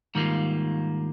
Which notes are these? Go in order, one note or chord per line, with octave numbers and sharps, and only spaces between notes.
G#2 D#3 G3 A#3 F4